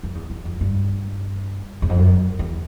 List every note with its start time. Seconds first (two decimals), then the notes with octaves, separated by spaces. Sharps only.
0.03 F2
0.15 E2
0.30 E2
0.45 F2
0.61 G2
1.82 E2
1.89 F2
1.98 F#2
2.39 E2